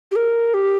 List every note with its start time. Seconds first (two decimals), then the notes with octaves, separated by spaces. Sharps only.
0.12 G4
0.16 A#4
0.54 G4